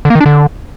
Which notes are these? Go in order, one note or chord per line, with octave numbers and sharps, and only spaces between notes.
D3
A#3
D#3
D4
D3